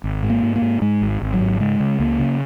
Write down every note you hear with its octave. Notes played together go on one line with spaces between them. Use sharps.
G#1
G#2
A#3
G#2
A#3
G#2
G#2 G#3
G#1
G#1
F#3
G#2
C#3 G#3
C#3
C#2 A#3
C#3